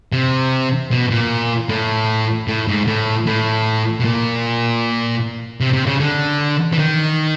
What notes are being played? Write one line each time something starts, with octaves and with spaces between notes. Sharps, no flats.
C3
B2
A#2
A2
A2
G#2
A2
A2
B2
A#2
C3
C3
C#3
D3
E3
D#3